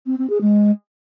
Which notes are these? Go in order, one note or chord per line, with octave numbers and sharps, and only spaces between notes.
C4
C4
G#4
G#3